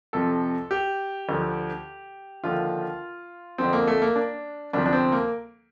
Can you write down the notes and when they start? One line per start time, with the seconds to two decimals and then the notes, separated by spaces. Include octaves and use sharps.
0.13 F2 C3 F3 A4
0.71 G4
1.29 D2 D3 F3
2.44 D#2 D3 F3 F4
3.58 F2 D3 F3 C4
3.73 A#3
3.87 A3
4.02 A#3
4.16 D4
4.73 D2 C3 F3 D4
4.86 D4
4.93 C4
5.12 A#3